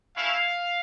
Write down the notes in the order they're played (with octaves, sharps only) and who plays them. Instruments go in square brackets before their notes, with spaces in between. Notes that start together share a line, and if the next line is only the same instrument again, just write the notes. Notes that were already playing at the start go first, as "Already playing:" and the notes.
[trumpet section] A3 C#4 E4 F5